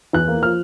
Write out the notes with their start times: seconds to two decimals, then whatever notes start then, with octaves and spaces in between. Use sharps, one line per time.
0.13 E2 F#6
0.28 A#3
0.42 F3 F6